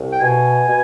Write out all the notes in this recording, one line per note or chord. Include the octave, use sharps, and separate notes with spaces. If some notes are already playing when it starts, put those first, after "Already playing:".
Already playing: C2
G5
B2 G#5
B2